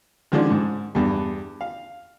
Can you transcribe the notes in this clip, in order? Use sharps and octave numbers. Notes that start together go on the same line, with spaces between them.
D3 D#3 F3 G#3 C#4 D4
G#2
E2 G2
F5